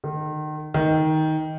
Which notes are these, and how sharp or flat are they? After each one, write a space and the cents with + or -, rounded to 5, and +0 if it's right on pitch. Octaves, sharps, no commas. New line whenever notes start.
D#3 -30
D#3 +10